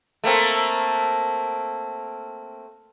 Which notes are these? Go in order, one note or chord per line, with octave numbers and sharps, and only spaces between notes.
A3 A#3 C4